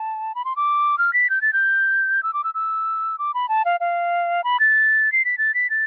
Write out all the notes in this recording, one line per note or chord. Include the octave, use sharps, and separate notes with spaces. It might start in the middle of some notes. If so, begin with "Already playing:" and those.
Already playing: A5
B5
C6
D6
F6
B6
G6
A6
G6
E6
D6
E6
E6
D6
B5
A5
F5
F5
B5
A6
C7
B6
A6
B6
A6